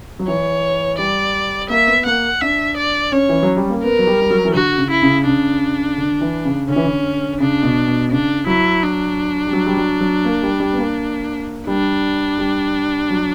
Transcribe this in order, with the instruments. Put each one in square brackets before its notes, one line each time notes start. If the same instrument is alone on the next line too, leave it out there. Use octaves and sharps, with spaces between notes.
[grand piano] F#3
[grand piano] E3 [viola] C#5
[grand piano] G3 [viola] D5
[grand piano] A#3 [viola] E5
[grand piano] B3
[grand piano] A#3 [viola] F#5
[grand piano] D4 [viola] E5
[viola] D5
[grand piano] C#4 [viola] C#5
[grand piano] E3
F#3
G3
A#3
[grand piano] B3 [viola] A#4
[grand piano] F#3
G3
G3
F#3
E3
[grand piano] D3 [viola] F#4
[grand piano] C#3
[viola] E4
[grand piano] C#3
[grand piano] C#3 [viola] D4
[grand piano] D3
E3
C#3
[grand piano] D3 [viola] C#4
[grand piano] E3
D3
[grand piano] C#3 [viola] D4
[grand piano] B2
B2
[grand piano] C#3 [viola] D4
[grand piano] F#3 [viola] E4
[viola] D4
[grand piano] G3
F#3
G3
F#3
F#3
A#3
G3
G3
B3
A#3
[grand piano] G3 [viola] D4
[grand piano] G3
F#3